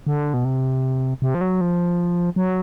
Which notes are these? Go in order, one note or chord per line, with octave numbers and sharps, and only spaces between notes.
D3
B2
C3
C3
F3
F#3
F3
F#3